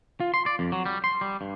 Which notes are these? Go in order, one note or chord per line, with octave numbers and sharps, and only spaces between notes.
F4
C6
D5
F2
F#3
G3
C6
G3
G2